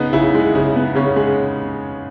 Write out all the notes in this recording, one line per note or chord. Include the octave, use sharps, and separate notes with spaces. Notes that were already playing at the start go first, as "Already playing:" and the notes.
Already playing: C#3 B3 D#4
C#3 E4
G#3
C#3
B3
C#3 C#4
G#3